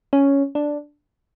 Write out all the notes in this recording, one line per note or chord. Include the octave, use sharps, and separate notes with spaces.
C#4
D4